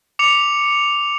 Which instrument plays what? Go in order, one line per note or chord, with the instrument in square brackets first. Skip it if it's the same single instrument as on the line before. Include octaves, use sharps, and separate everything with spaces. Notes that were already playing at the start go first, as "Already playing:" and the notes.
[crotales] D6 C#7 F7